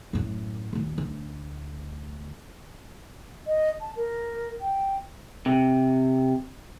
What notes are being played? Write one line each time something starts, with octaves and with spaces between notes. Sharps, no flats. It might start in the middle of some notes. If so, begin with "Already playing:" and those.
F#2 A2
D#2 A#2
D2
D#5
A5
A#4
G5
C3